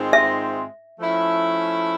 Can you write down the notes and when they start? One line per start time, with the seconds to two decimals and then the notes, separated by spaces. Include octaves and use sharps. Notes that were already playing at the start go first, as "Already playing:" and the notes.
Already playing: G#2 D#3 G#3 C4 F4
0.13 E5
0.99 F3 A3 C#4 E4